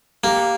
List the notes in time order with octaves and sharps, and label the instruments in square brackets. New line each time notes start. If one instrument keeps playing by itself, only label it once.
[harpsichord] A#3 [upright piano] G4